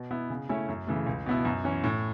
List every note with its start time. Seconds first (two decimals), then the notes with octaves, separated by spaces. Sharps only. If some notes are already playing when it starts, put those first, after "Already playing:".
Already playing: B2
0.11 B3 E4
0.30 C#3
0.49 A3 C#4 E4
0.68 F#2
0.87 C#3 E3 A3
1.07 C#2
1.26 B2 B3 E4
1.45 F#2
1.64 E3 C#4
1.84 A2